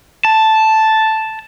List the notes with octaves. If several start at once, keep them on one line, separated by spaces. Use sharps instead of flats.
A5